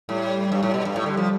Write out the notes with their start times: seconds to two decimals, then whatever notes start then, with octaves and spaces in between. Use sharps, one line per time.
0.09 A2 G3
0.52 G2
0.63 A2
0.74 B2
0.85 G2
0.96 A2
1.06 D3
1.17 F3